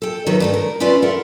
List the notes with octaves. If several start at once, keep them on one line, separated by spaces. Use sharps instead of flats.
A4 G5
D#3 F#3 C#4 B4
G2 A3 A4
A#4
C#4 E4 F4 B4 D5
A4 A#4 E5 F#5